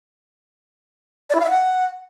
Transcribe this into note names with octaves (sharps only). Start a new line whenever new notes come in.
D5
E4
F5
E5
F#5